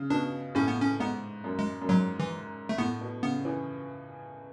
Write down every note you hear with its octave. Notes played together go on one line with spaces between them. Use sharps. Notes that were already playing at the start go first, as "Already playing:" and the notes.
Already playing: C#3
B2 D4
A2 C#4
B3
C#4
G#2 B3
F#2
G#3
F#2
G#2 F#3
E3
A3
A2 B3
B2
C#3 B3
E3